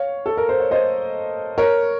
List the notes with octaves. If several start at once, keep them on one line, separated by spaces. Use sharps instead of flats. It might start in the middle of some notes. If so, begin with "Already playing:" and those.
Already playing: C#5 F5
A4
A#4
C5
C#5
C5 D#5
A#4 C#5